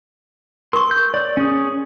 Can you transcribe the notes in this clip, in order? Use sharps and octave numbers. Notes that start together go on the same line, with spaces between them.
A#4 C6 C#6
G6
C#5 D5
C#4 G#4